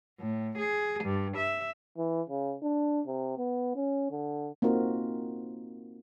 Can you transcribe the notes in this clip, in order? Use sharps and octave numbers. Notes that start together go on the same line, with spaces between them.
A2
G#4
G2
E5
E3
C#3
D4
C3
B3
C#4
D3
A#3 C4 D#4 F4 F#4 A#4